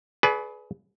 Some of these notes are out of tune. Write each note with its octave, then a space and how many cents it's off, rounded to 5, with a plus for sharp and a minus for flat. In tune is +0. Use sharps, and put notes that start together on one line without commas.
G#4 +30 B4 +0 D5 -20